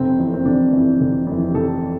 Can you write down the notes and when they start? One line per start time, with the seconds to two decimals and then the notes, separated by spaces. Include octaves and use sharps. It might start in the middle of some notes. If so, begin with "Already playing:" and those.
Already playing: F1 C4
0.19 F2 E3
0.34 C4
0.45 F1 D4
0.72 E3
0.77 F2
1.01 F1
1.27 F2 E3
1.49 G4
1.54 F1 A4